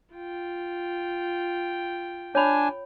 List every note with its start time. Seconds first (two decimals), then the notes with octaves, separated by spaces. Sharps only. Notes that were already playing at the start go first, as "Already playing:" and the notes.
0.13 F4 G5
2.35 D4 C#5 G#5 B5